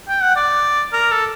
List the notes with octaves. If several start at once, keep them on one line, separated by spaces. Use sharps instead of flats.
G5
F#5
D5
A#4
A4